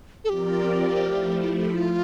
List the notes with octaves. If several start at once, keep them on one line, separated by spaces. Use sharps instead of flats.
A4
F3 C4 F4 G4 A#4 D5
F3 A3 E4
F4